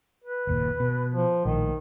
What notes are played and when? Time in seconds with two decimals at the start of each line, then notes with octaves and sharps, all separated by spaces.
0.24 B4
0.47 F#1 D#2 A#2
0.80 B2
1.12 F3
1.45 A#1 A2 D#3